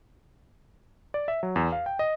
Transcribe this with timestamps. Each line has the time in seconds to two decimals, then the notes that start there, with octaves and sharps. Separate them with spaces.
1.14 D5
1.28 E5
1.43 F#3
1.56 E2
1.72 F5
1.86 G5
1.99 D#5